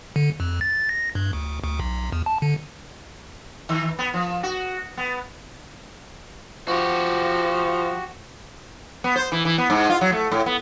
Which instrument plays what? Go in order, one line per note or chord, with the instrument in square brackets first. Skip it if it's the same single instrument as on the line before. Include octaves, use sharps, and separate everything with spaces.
[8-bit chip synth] D3
F2
A6
A#6
G2
D2
D2
B1
E2
A5
D3
[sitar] D#3
B3
F3
F#4
B3
[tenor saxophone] F3 [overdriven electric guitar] F#4 G4
[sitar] B3
C5
E3
E3
B3
G#2
F4
F#3
A3
A2
B3